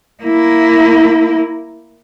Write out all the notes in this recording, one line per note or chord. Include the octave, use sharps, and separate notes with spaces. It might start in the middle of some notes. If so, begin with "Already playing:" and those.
A#3 E4